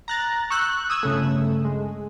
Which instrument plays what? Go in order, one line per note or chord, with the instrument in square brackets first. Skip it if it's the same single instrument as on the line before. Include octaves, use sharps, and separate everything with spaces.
[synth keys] A#5 F#6 A6
C#6 E6 F#6 G6
D#6 E6 G#6
G1 C#3 A3
G#3